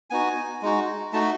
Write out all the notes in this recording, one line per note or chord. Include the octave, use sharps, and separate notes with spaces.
B3 D#4 F#4 G#5
G#3 D#4 F#4
A3 D#4 F#4 A5